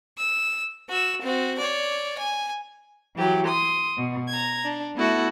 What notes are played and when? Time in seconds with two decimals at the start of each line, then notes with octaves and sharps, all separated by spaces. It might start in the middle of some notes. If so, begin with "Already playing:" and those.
0.18 E6
0.89 F#4 E6
1.21 C4 F#4
1.58 C#5 D5
2.18 G#5
3.17 E3 F#3 G4
3.47 C6 D#6
3.97 B2
4.28 A#5 G#6
4.64 D4
4.95 A3 B3 E4 F#4 A4